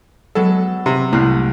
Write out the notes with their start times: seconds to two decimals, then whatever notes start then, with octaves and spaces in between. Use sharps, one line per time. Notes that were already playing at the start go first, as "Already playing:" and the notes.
0.35 F#3 G#3 B3 A4
0.86 C3
1.13 C2 A2 F#6 C7